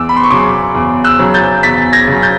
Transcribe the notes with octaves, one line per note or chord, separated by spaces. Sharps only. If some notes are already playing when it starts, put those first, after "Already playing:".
Already playing: E2 D6 E6
B5
C6
C#6
C#3 F#3 C6 D6
E2
E6 F#6
C#3 F#3
G6 A6
E2 A6 B6
G#6 A#6
C#3 F#3
G6 A6